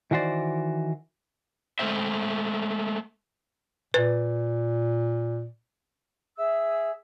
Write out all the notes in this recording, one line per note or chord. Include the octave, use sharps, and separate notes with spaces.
D#3 E3 F#4 C5 D5
G#3 A3 C4 C5 E5
A#2 B4
G#4 E5 E6